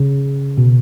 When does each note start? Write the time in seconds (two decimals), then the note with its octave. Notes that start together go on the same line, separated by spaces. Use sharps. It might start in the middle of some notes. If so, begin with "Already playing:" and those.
Already playing: C#3
0.58 B2